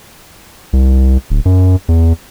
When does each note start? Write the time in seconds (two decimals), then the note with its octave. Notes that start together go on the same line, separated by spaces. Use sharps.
0.73 C2
1.30 D1
1.45 F#2
1.89 E2